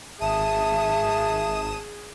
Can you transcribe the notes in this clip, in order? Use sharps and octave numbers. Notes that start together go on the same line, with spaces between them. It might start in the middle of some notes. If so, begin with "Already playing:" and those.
G#1 G#4 E5 A5 D#6 E7